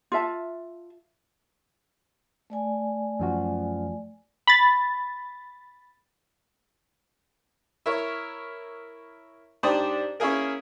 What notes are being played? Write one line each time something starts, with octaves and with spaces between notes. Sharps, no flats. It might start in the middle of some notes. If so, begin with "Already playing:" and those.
F4 E5 A5
A3 D5 G#5
F#2 F3 F#4
B5 A6
E4 A#4 C#5
G#2 D4 G4 C5 D5 D#6
A#3 C#4 E4 F4 G#4 A#4